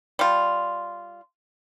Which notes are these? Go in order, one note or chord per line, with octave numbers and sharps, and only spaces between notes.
G3 F4